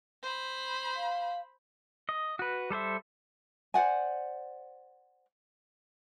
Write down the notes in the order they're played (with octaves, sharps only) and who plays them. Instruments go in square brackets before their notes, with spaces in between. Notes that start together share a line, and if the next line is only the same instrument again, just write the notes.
[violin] C5 B5
[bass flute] F5
[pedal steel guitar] D#5
F#4 B4
G3 A4 C5 E5
[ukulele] C5 D5 F#5 G#5